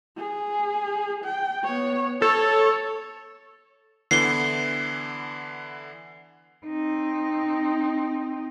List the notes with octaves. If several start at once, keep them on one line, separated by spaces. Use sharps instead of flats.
G#4
G5
B3 C#5
A4 C#5
D3 E3 B3 C7 G7
C4 D#4